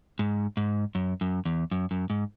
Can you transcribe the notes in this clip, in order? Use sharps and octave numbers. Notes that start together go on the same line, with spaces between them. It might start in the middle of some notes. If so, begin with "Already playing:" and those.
G#2
G#2
F#2
F#2
E2
F#2
F#2
G#2